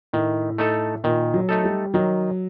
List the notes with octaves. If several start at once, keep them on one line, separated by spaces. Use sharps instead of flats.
A2 D#3
A3 D#4 A4
A#2 D#3
F#3
A3 D#4 A4
G3
D#3 F#3